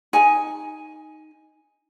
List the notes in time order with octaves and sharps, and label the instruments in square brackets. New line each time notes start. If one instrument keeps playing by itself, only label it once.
[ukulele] D#4 G#5